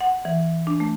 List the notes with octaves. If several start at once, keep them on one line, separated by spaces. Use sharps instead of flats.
F#5
E3
D4
A3